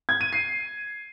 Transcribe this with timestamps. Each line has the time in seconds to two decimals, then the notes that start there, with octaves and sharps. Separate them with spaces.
0.09 G#6
0.21 D#7
0.33 C7